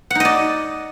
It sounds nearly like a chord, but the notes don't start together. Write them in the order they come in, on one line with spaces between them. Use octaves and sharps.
F#5 D#4 D#5 D5